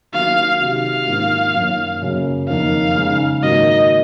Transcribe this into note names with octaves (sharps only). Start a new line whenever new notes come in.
D#3 F#3 A#3 F5
C3 D#3 F#3 F5
G#2 D#3 F#3 A#3 F4
F#2 D#3 A#3
F#2 C#3 F#3 A#3
F2 D#3 A#3 D#4 F5
C#3 G#3 D#4
G#2 D#3 F#3 A#3 D#4 D#5